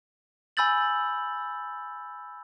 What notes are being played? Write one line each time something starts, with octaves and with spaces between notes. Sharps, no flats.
G#5 B5 E6 G6 A6 F#7